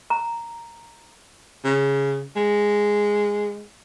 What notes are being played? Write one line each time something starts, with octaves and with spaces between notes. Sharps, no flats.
A#5
C#3
G#3